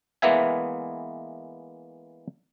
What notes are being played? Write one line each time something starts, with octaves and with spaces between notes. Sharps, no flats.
E3 G#3 A#3 B3 E5 G#5